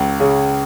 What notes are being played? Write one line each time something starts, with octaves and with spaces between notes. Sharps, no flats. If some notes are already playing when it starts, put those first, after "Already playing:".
Already playing: C#2
C#3